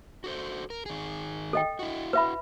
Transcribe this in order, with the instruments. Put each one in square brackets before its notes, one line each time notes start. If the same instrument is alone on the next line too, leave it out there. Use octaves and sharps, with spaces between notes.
[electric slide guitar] F#4 A4 C5
A#4
D#3 G#4
[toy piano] A4 D#5 G5
[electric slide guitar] E4 F#4
[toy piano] B4 E5 B5